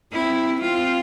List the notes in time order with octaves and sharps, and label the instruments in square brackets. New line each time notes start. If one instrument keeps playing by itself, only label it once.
[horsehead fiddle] C4 [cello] E4
[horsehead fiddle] C4 [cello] F4